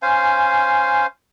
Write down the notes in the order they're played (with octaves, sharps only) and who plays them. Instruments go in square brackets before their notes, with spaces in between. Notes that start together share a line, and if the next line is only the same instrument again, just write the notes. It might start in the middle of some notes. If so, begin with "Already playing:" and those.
[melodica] C#4 C5 F5 G#5